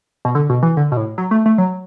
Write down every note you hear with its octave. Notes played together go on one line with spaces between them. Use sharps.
B2
D3
B2
E3
D3
B2
A2
F#3
A3
A3
F#3